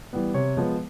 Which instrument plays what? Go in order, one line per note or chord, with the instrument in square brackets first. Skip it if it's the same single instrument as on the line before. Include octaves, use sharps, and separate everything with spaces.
[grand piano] E3 G3 B3
C3 C#5
F3 G#3 B3